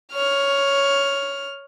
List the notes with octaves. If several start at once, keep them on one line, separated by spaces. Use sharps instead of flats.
C#5 F6